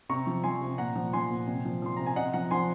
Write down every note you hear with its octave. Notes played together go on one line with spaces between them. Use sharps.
C3 A#5 C#6
F3
F3 G#5 C6
C3
A#2 F#5 A#5
F3
F3 G#5 C6
A#2
C3
F3
F3 C6
C3 A#5
G#5
C3 D#5 F#5
F3 F#5 A#5
F3 G#5 C6